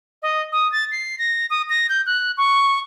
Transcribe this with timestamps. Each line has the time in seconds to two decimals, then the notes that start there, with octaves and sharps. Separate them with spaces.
0.22 D#5
0.52 D#6
0.72 A6
0.92 C7
1.19 A#6
1.50 D#6
1.70 A#6
1.89 G6
2.06 F#6
2.37 C#6